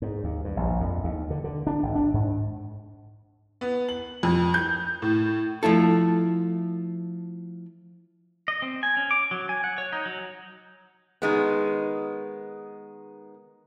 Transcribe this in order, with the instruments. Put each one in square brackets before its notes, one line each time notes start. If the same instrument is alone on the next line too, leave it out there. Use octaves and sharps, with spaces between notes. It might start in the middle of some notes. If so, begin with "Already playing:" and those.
[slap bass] G#2
D#2
G2
A#1
F2
D#2
D3
D3
D4
G#1
D4
G#2
[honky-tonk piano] B3
F#7
F2
G6
A2
[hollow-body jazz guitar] F3 A3 E4 A4
[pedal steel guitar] D#5
C4
G#5
C#4
D6
F#3
G#5
F#5
C#5
D#4
F#3
[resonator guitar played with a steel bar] D#3 G#3 B3